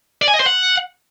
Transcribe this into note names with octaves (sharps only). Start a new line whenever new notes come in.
D5
G#5
D#5
C5
F#5